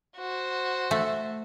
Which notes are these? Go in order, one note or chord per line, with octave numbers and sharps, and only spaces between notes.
F#4 C5
A3